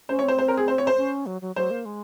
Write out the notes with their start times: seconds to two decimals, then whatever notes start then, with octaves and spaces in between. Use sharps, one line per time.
0.09 C#4 C5
0.19 C#5
0.23 C4
0.28 C5
0.38 C5
0.48 A#4
0.57 G#4
0.68 C5
0.78 C#5
0.87 C5
0.97 C#4
1.26 F#3
1.42 F#3
1.56 F#3 C5
1.71 A#3
1.85 G#3